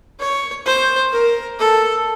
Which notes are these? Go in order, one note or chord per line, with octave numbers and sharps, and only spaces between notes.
C#5
C5
A#4
A4